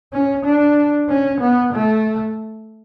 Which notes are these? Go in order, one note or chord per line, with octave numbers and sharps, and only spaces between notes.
C#4
D4
C#4
B3
A3